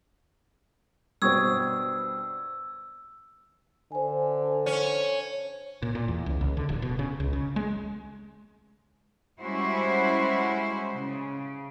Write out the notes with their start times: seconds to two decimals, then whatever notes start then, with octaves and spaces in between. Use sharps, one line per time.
1.22 G2 B2 C4 C#6 D#6 E6 G#6
3.92 D3 C5 G#5
4.66 C#4
5.82 A#2
5.95 A#2
6.08 E2
6.26 C#2
6.41 C#2
6.57 D3
6.69 D1
6.82 B2
6.99 C#3
7.20 C#2
7.33 C#3
7.56 G#3
9.40 G3 G#3 C#4 E4 F#4 C5
10.92 C#3